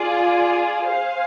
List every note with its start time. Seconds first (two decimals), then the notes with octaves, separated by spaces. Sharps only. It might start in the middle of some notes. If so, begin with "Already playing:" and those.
Already playing: F4 G#4 D5
0.88 G#4 C5 F5